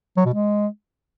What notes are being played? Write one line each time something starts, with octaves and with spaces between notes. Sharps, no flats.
F#3
B2
G#3